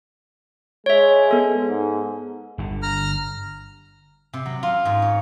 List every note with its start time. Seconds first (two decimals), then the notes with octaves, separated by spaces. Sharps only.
0.86 G#3 C#5 E5
1.31 B3 A4
1.66 G#2
2.58 G1 D3
2.82 A#5 F6
4.33 C3
4.46 F#3
4.63 F4
4.85 G#2
5.02 C#5